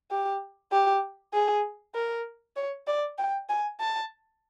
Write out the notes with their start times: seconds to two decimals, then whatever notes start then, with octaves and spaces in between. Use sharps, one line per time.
0.11 G4
0.72 G4
1.33 G#4
1.95 A#4
2.56 C#5
2.87 D5
3.18 G5
3.49 G#5
3.80 A5